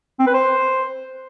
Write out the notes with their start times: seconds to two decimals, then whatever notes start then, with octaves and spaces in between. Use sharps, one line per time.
0.20 C4
0.27 B4
0.34 C5